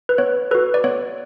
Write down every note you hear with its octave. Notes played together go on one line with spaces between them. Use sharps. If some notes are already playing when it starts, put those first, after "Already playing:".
B4
B3 C#5
F#4 A4 B4
D5
B3 C#5